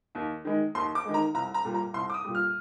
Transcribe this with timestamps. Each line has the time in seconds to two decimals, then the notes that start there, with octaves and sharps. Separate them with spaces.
0.15 D#2
0.45 D#3 G#3
0.75 D#2 C6
0.95 D6
1.05 D#3 G#3
1.14 A#5
1.34 C2 A#5
1.54 A#5
1.65 A#2 G3
1.74 A#5
1.94 C2 C6
2.10 D6
2.14 D#6
2.24 A#2 G3
2.35 F6